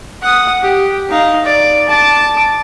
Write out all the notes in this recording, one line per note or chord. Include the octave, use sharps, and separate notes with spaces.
F#5 D#6
G4
D#4 F5
D5
A5 D6